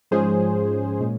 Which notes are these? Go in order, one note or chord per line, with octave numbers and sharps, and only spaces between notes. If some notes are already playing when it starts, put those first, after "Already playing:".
G#2 F3 G#3 C#4 G#4 C5
A#2 G#3 C#4